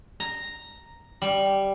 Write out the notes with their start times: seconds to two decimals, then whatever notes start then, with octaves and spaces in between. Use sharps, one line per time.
0.20 A#5
1.22 G3